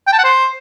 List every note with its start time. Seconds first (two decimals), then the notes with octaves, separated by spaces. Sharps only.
0.07 G5
0.13 A5
0.18 F#5
0.24 C5